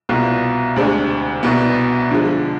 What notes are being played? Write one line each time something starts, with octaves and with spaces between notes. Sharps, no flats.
C2 B2 B3 F4
D2 C3 G#3 D4
C2 B2 B3
D3 F3 G#3